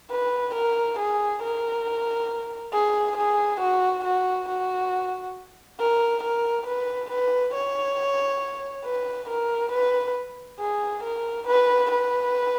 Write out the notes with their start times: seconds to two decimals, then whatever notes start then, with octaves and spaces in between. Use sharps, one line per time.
0.11 B4
0.55 A#4
0.99 G#4
1.42 A#4
2.73 G#4
3.17 G#4
3.60 F#4
4.04 F#4
4.49 F#4
5.79 A#4
6.23 A#4
6.67 B4
7.10 B4
7.54 C#5
8.85 B4
9.29 A#4
9.72 B4
10.60 G#4
11.04 A#4
11.47 B4
11.91 B4